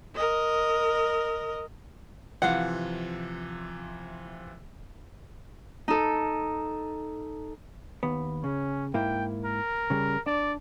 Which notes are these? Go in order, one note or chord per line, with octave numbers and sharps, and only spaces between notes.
A#4 D#5
C3 E3 F3 F5 F#5
D#4 A4
D#2 B3
C#3 C#4
G#2 A#3 E4 G5
A#4
C#3 G3
D4 D5